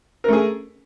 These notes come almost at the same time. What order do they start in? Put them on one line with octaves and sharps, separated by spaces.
A#4 A3 G#4